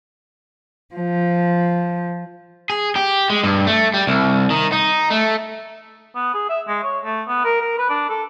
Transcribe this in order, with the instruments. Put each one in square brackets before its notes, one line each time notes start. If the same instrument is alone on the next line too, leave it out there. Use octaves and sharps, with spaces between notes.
[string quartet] F3
[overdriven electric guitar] G#4
G4
G#3
G2
A3
G3
C2
D#3
D#4
A3
[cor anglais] B3
G#4
E5
G#3
C#5
A3
B3
A#4
A#4
B4
D4
A4